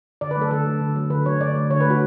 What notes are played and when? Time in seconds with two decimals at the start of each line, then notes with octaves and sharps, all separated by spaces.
0.21 D3 D5
0.31 B4
0.37 F#3 A3 A4
0.51 D3 A4
0.66 F#3 A3
0.81 D3
0.96 F#3 A3
1.10 D3 B4
1.25 F#3 A3 C#5
1.41 D3 D5
1.55 A3
1.70 D3 C#5
1.81 B4
1.85 A3 F#4